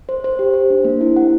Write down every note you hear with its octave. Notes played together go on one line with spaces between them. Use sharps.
C5
C5
G4
C5
D4
A#3
E4
F#5